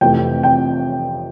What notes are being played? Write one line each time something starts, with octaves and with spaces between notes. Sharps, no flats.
F2 C3 E3 A3 G5
G5